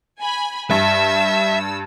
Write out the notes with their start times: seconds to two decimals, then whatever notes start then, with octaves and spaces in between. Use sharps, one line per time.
0.20 G#5 B5
0.71 G2 E5 E6